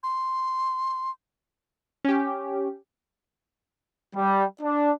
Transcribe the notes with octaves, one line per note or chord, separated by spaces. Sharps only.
C6
C#4 G4
G3
D4